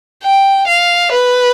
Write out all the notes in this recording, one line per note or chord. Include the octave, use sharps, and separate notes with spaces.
G5
F5
B4